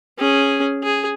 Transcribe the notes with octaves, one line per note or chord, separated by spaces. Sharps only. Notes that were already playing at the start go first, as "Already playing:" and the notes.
C#4 G#4
G#4